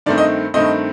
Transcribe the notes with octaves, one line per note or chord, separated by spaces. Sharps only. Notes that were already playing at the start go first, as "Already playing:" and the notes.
G2 D#3 A3 C4 D5
D#5
G2 D#3 A3 C4 D#5